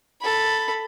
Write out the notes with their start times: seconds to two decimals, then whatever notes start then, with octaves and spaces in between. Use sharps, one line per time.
0.21 A4 B5